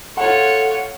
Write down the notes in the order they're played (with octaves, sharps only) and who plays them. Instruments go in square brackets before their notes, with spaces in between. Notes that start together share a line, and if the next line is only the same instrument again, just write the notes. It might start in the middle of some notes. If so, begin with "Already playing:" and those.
[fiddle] F4 C#5 [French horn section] A4 [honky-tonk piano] F#5